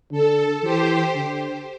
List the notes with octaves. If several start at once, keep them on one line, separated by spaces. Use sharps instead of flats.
D3 A4
E3 G4 C5
D3